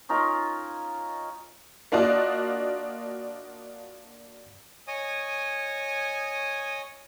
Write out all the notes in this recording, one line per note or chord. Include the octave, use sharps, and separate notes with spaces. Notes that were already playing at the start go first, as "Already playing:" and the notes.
C#4 D#4 F4 A#4
A#3 D4 F4 F#4 D5 D#5
C#5 D#5 G#5 D#6